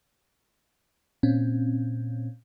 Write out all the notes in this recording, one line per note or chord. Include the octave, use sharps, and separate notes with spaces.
A#2 C4 C#4